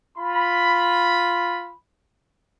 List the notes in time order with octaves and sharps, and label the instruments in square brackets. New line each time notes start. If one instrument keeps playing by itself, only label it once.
[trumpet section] F4 B5